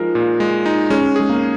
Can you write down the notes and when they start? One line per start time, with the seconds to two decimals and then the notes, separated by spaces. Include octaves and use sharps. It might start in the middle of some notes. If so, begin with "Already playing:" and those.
Already playing: F3 G#3 D#4 A#4
0.15 A#2
0.40 G#3
0.66 D#4
0.90 G#3 C#4
1.16 G#3 G#4
1.29 A#3